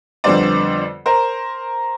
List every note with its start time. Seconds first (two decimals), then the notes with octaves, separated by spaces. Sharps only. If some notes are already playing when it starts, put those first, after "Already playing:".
0.24 F2 D3 G3 B3 C5 D5
1.06 A#4 C5